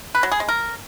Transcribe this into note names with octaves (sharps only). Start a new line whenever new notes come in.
B4
F#3
G#4
G#3
A#4